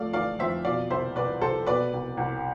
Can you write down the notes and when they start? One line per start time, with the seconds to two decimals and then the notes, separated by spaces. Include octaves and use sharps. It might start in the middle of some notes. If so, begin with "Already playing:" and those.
Already playing: F2 A3 D5 F5
0.13 E3 D5 F5
0.39 F2 C5 E5
0.65 B2 D5 F5
0.90 C2 C5 E5
1.16 C2 B4 D5
1.41 C2 A4 C5
1.67 B2 B4 D5
1.93 C2
2.17 C2